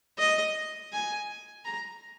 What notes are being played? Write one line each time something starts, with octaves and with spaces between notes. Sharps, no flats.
D#5
G#5
A#5